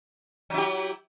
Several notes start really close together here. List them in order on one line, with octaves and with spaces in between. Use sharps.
F#3 E4 G4